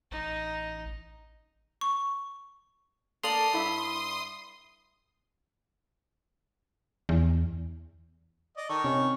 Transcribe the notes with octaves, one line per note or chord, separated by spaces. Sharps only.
A1 D#4
C#6
A#3 A4 D5 C6 D#6 F7 F#7
G2 E4 E5
E2
D5 D#5
D#3 A4 C#6
C3 C#4 D#4